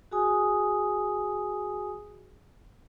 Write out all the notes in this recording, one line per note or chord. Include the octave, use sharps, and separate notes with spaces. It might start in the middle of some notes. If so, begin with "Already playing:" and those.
F#4 G#4 G#5 D#6